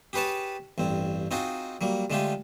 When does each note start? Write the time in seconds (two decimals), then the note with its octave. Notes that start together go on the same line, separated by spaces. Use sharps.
0.13 G4 G#4 B4 C#5 A5
0.78 A1 G2 C4
1.31 C4 D#4 F4 F#4 G#4
1.81 F#3 G3 A#3
2.10 D3 G#3 A3 F4 G4